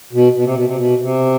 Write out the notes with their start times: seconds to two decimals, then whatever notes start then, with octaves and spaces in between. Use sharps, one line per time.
0.13 B2
0.34 B2
0.44 C3
0.55 B2
0.66 C3
0.76 B2
1.02 C3